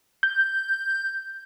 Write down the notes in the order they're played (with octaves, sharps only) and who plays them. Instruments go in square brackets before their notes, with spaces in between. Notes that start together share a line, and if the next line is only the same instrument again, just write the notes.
[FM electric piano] G6